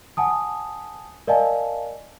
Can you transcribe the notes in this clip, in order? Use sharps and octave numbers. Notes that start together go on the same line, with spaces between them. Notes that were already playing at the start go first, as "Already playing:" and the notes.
F#5 G#5 A5 D#6
A#4 D5 D#5 F5 G#5 A5